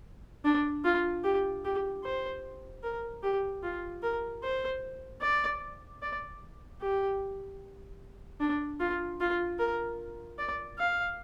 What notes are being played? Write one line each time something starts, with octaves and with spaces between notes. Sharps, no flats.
D4
F4
G4
G4
C5
A#4
G4
F4
A#4
C5
D5
D5
G4
D4
F4
F4
A#4
D5
F5